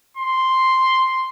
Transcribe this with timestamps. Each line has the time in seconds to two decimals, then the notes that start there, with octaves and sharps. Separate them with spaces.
0.17 C6